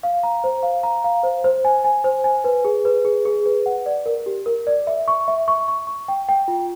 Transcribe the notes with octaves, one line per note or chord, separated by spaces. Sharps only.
F5
A#5
C5
F5
A#5
F5
C5
C5
G#5
G#5
C5
G#5
B4
G#4
B4
G#4
G#4
B4
F#5
D5
A#4
G4
A#4
D5
E5
C#6
E5
C#6
C#6
C#6
G5
G5
F4